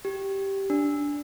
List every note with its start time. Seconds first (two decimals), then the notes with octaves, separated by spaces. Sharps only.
0.05 G4
0.70 D4